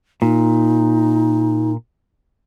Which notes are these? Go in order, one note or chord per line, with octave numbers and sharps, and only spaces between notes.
A#2 D#4